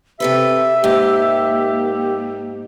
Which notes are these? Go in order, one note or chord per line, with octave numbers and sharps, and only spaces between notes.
C3 G4 A4 B4 E5
G#2 A#3 G4